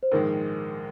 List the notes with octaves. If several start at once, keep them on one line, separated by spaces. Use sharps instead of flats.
C5
A#1 G#2 D#3 G#3 A#4